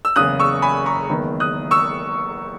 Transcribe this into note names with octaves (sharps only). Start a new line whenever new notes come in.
E6
F#1 E2 C#3 D#6 F#6
C#6 E6
G#5 B5
A#5 C#6
F#1 E2 D#3 G#3 B3
D#6 F#6
C#6 E6